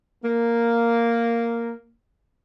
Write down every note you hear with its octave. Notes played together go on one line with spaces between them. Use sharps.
A#3